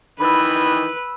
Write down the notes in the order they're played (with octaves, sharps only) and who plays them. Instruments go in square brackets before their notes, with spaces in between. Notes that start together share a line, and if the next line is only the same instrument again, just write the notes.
[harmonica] D#3 E3 [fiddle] B4 [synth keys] B5 E6